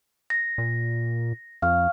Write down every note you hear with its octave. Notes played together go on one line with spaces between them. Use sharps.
A#6
A#2
F2 F5 C#6 F6